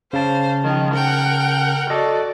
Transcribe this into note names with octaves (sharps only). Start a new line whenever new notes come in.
C#3 C5 F5 A5
D#3 F3
A#4 F#5 G5
F#4 A4 D5 D#5